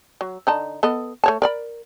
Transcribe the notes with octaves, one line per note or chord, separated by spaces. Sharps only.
F#3
D3 D#4 A5
B3 A4 D#5
A3 C#5 A5
A#4 D5 B5